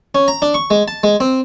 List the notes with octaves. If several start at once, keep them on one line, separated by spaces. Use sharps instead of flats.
C#4
A#5
D4
C#6
G#3
A5
G#3
C4